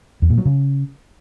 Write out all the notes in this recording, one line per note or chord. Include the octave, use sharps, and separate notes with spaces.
E2
A#2
F#3
C#3